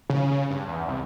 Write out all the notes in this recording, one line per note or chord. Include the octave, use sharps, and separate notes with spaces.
C#3
C#3
G2
E2
C2